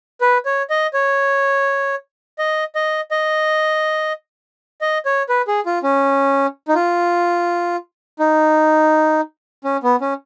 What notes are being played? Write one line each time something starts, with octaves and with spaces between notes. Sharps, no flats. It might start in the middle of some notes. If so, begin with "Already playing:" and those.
B4
C#5
D#5
C#5
D#5
D#5
D#5
D#5
C#5
B4
G#4
F4
C#4
D#4
F4
D#4
C#4
B3
C#4